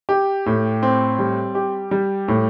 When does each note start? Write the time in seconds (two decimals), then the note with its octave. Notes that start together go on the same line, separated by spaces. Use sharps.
0.09 G4
0.46 A2
0.83 C4
1.19 G3
1.55 G4
1.91 G3
2.28 A2